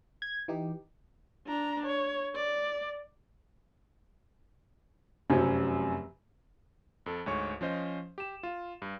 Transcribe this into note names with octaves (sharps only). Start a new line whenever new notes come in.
G#6
E3 D#4 G4
D4 A#5
C#5
D5
F1 F#2 C3 F#3 C#4 C5
F2 A4
D2 G#2 C#5 C#6
F3 C#4 C5 D#5
G4 E7
F4
G2